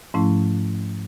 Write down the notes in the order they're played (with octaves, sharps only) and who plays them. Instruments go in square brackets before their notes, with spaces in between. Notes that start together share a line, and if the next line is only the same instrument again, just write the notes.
[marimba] G#2 F3 A3 C#4 E4